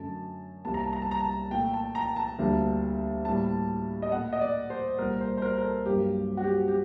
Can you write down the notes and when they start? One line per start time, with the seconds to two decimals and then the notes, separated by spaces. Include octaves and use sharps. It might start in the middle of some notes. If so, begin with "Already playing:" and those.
Already playing: F#2 D3 A3 A5
0.65 C2 C3 G3 A#3 A5
0.74 A#5
0.84 A5
0.93 A#5
1.02 A5
1.11 A#5
1.20 A5
1.51 A#2 A3 G5
1.74 A5
1.95 A#5
2.16 A5
2.38 D2 D3 G3 A#3
3.25 A2 G3 A#3 A5
4.02 D#5
4.12 A#2 A3 F#5
4.33 D#5
4.41 D5
4.70 C5
4.99 C2 A#2 G3 A#3 A#4
5.21 C5
5.37 C5
5.42 A#4
5.58 A#4
5.64 A4
5.86 G2 F#3 A#3 G4
6.37 F#4
6.44 G4
6.68 G4